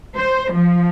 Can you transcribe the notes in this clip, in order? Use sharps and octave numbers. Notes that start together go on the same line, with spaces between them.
C5
F3